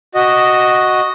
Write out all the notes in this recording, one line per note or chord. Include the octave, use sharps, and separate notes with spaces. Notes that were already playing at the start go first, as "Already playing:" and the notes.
F#4 D#5